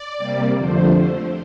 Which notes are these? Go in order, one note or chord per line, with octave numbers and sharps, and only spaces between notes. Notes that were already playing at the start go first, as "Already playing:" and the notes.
Already playing: D5
C3 G3 A#3
F2 D3 F3 A3 C5